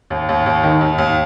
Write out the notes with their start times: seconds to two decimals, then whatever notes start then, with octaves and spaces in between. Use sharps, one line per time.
0.10 D#2
0.29 D#2
0.46 D#2
0.64 D#3
0.81 D#2
0.98 D#2